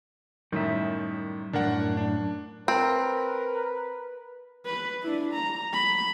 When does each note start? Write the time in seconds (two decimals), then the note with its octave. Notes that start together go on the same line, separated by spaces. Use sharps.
0.52 F#2 A2 D#3 G3 E5
1.53 F#2 A2 C3 D4 A#4 F#5
1.97 D4
2.68 C4 A#4 B4
4.66 B4
5.03 D4 E4
5.34 A#5
5.73 B5